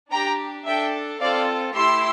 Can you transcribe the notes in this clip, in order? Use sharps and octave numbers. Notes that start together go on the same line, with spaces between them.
D4 G4 G5 A#5
D4 A4 E5 G5
C4 F4 A4 D5 F5
A3 E4 G4 C6 E6